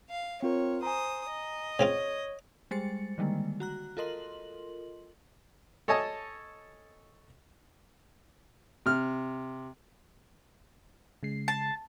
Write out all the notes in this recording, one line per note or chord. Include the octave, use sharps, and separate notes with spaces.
F5
C4 F4 A#4 C#5
C5 G#5 A#5 D#6
D#5
C#3 C4 F4 C#5
G3 G#3 C5 A6 C#7
D3 D#3 G3 G#3 A#3
F#4 A#5 F#6
F4 A4 A#4 D#5 C6 F#7
A4 C#5 D#5 G#5 A5 D#6
C3 F6
C#3 G#3 C7
A5